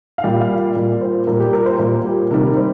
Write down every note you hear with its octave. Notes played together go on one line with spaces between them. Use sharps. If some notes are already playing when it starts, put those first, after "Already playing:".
F5
A#2 G3 G5
F5
A#2 G3
C5
A#2 G3 A#4
G4
A#4
C5
A#2 G3 A#4
G4
C3 D#3 G3 A#4
C5